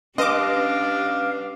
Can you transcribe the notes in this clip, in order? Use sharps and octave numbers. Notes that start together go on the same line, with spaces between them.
G3 C#4 D4 B4 D#5 F5 D6